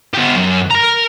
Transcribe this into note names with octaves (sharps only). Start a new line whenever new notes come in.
B3 G4
F#2
A#4 A#5